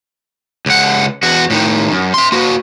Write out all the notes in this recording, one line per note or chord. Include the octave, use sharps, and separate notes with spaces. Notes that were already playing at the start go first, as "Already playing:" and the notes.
C#2 F#5
E2 F#4
A2 D#3
F#2
E5 C6
A#3 F#4